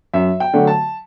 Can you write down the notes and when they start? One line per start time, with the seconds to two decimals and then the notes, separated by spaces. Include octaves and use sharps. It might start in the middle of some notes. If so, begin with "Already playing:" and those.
0.13 F#2 E5
0.40 G5
0.53 D3 F#3 A3
0.67 A5